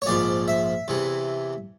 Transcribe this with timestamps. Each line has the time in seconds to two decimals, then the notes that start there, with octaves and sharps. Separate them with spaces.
0.02 C#5
0.06 A#1 G#2 F3 D5
0.48 E5
0.88 E2 C3 E3